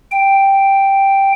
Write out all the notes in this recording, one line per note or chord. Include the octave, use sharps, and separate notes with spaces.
G5